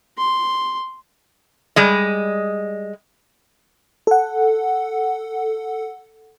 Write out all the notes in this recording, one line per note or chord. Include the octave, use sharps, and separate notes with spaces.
C6
G3 G#3 D#5
A4 F#5